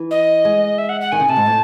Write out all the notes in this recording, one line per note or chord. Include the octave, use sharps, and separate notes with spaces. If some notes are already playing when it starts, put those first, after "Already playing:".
Already playing: E3
D#5
G#3
E5
F#5
F#5
D#3 G#5
C#3
C3 A5
G#2
A2